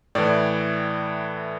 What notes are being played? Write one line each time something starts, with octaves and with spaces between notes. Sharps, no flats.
A2 E3 D5